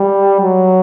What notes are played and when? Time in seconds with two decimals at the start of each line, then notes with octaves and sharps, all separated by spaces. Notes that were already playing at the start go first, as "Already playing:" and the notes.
Already playing: G3
0.40 F#3